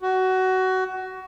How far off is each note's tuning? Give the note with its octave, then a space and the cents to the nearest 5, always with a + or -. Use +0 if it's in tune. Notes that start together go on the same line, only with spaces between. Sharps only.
F#4 +20